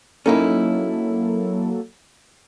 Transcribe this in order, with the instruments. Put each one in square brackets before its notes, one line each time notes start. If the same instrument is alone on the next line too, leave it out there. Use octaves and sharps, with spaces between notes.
[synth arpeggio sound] F#3 A#3 A4 [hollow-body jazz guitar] C#4 D#4 E4